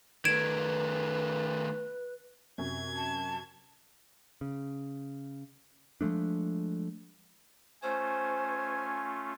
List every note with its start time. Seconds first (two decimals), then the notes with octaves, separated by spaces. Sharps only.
0.25 D#3 A3 B4 G#6 D7 E7
2.58 F#2 C3 G#6
2.96 A5
4.41 C#3
6.01 F3 G#3 A3 D4
7.83 A3 C#4 F4 C5 G#5